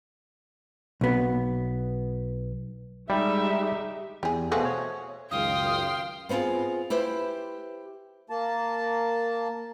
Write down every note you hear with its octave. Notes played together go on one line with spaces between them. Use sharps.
B1 B3
G3 G#3 D#4 G4 E5
E2 G4 G#4
B2 F3 A3 F#4 G#4
C#5
C#2 F#2 D#3 F5 G5 C6 D#6
B3 C4 D#4 F4 G#4
E4 G4 B4 C5
A#3 A5